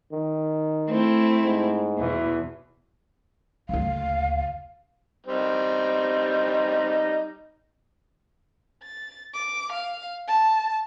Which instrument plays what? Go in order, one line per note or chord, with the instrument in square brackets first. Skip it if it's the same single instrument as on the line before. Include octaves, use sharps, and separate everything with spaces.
[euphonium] D#3
[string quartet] A3 C4 E4
[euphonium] G#2
[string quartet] E2 B2 E3
[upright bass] F#1 D2 [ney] F5
[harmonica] G3 C4 D#4
[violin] A6
D6
F5
A5